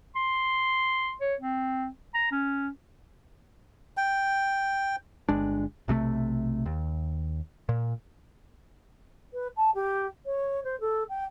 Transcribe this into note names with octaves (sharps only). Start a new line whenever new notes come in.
C6
C#5
C4
A#5
C#4
G5
G1 G#3 D4
B1 C3 F3 A3
D#2
A#2
B4
A5
G4
C#5
C5
A4
G5